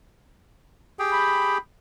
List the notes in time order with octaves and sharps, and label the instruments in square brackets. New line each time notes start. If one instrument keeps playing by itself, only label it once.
[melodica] G4 G#4 G5
[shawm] B5